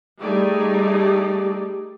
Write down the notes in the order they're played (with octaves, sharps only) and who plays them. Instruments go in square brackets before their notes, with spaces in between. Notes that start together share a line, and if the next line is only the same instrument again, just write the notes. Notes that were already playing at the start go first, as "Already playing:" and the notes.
[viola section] G3 A3 D#4 G4 G#4 D5